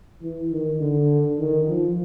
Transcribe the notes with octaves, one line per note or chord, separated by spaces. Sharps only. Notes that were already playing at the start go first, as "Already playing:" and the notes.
E3
D#3
D3
D#3
F3